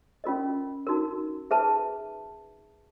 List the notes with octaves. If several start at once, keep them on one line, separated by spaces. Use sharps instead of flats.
C#4 F4 A#4 D#5
D#4 F#4 A#4
G#4 B4 E5 A5